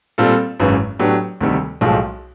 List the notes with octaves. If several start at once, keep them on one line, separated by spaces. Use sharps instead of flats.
A#2 G3 C4 F4 A4
G#1 F#2 C#3 E3
A2 F#3 B3 D4 G4
D2 C3 D#3 G3
B1 A2 F3 G#3